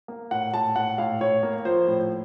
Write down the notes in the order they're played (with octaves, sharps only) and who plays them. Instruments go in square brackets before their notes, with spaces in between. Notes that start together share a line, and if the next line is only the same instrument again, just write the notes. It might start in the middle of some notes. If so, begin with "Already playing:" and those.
[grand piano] A#3
A2 F#5
A2 A5
A2 F#5
A2 F5
A2 C#5
A#3
F3 C5
A2